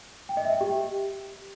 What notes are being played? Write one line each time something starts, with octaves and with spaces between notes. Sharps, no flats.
G5
D#5
E5
G5
G4